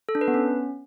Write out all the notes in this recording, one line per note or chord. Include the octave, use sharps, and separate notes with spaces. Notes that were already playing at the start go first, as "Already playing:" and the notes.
A4
D4
B4
B3
C#4